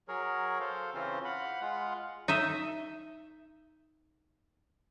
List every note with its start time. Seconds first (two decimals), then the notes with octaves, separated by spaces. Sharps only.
0.08 F#3 G#4 A#4 C#5
0.60 A4 C5 F5
0.94 C#3 E3 C4 C#4 F4 C5
1.25 F5 F#5 B5
1.61 G#3 F4 F5 F#5
2.28 D#4 D#5 E5